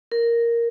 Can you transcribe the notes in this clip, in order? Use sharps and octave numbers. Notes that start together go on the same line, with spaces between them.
A#4